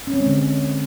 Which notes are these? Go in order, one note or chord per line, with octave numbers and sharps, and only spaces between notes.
C#4
C4
G#3
D3